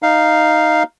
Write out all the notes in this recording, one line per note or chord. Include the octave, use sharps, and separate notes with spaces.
D#4 F5